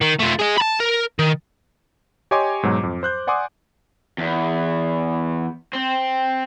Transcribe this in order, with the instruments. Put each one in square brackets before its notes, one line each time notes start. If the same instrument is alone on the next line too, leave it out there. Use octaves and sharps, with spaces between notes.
[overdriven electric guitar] D#3
A3 F4
G#4 D#5
A5 B5
A#4
D#3
[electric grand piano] G4 C#5 D#5 G#5 C6 D6
G#2 B2 F#3
F2
C5 F#6 G6
D5 F#5 G#5 C6 D6 D#6
[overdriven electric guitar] E2
C4